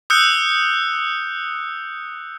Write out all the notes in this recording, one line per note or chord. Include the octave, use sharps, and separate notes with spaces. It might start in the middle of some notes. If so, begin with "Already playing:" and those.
D#6 E6 F#6 G6 C#7